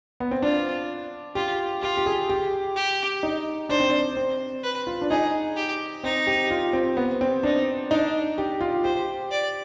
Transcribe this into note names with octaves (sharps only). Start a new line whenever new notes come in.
B3
C4
D4 F4
F4 G4
F4 G4
G4
G#4
G4
G4
D#4
D4 C5
C4
D4
C4
B4
F4
D4
D#4 G#4
G4
C4 D#4
G4
F4
C4
B3
C4
D4 D#4
D4 D#4
G4
F4
G4 C5
D5